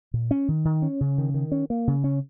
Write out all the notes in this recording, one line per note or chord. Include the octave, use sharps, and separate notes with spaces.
A#2
C#4
D#3
D#3
C#4
C#3
D#3
D#3
C#4
A#3
C#3
C#4